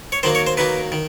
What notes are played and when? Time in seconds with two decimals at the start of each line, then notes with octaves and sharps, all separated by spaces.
0.12 C#5
0.23 D#3 F#3 A#3 C5
0.35 C#5
0.47 C5
0.57 D#3 F#3 A#3 B4
0.92 D#3